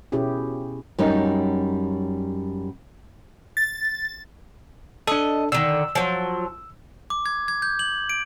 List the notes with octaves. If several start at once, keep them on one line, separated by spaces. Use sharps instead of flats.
B2 C#4 E4 G4 G#4
F#2 G3 C#4 D#4
A6
D4 A4 D#5
D3 D#3 E6
F3 F#3
D6
G#6
G#6
G6
F#7
D7